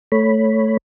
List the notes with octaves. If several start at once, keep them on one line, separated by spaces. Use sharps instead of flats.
A3 C#5 B5